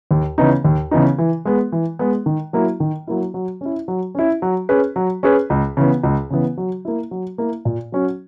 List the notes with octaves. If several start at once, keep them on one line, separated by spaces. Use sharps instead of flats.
D#2
C#3 E3 B3 D#4
D#2
C#3 E3 B3 D#4
E3
G#3 B3
E3
G#3 B3
D#3
F#3 A#3 E4
D#3
F#3 A#3 E4
F#3
C#4 E4
F#3
C#4 E4
F#3
C#4 G#4 B4
F#3
C#4 G#4 B4
C#2
C#3 E3 B3
C#2
C#3 E3 B3
F#3
A#3 E4
F#3
A#3 E4
A#2
F#3 C#4 F#4